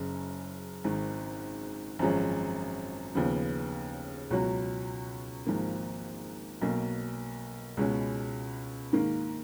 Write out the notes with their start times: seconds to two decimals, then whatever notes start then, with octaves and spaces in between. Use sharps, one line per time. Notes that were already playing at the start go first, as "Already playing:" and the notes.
Already playing: F#1 F#2 C#3
0.84 G#1 G#2 D#3
1.99 G#1 F#2 F3 G#3 C#4
3.15 D#2 C#3 F3 B3
4.30 C#2 B2 F#3 C#4 F#4
5.46 G#1 G#2 F3 A#3
6.61 B1 B2 A#3
7.77 C#2 B2 G#3 C#4
8.93 G#2 D#3 A#3